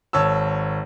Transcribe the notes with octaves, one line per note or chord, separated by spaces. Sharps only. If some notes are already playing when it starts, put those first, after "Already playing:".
G#1 C#5 A5 E6